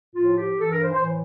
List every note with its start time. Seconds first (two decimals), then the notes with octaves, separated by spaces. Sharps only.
0.15 A2 F3 F4
0.37 G4
0.59 G2 E3 A4
0.70 A#4
0.82 C5
0.92 C5
1.03 A2 E3